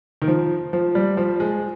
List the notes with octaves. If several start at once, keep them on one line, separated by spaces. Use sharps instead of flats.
D#3
F3
F3
G3
F3
G#3